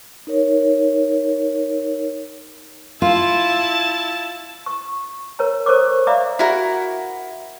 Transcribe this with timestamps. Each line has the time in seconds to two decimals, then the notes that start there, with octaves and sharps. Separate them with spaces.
0.27 D#4 A#4 C#5
3.02 E4 F4 A5
4.66 C#6
5.39 A#4 C#5 A#5
5.66 A4 A#4 C5 C#5 C#6 D6
6.07 D5 E5 F5 A#5 B5 D6
6.39 E4 F#4 A#4